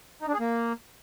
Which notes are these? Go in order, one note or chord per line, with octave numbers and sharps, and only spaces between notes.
D#4
D4
G#4
A#3